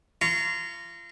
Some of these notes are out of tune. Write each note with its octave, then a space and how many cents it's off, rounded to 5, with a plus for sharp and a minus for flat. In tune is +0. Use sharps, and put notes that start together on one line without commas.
F4 -30 A#5 -15 C#6 +15